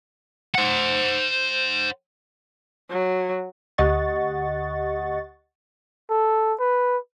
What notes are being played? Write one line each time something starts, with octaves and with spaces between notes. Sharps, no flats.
C5 F#5
F#3
D2 G4 D#5 F#5 C#6 A6
A4
B4